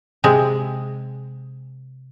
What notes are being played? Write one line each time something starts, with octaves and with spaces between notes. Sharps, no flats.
C3 G#3